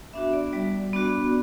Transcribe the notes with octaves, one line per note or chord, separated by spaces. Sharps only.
B3 D4 F#4 E5
D5
G3 D5
B3 D4 F#4